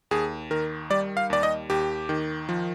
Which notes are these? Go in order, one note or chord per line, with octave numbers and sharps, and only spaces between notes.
D#2 G#4
D#3 A#4
G3 D5
F5
D#2 D5
D#5
D#2 G4
D#3
F3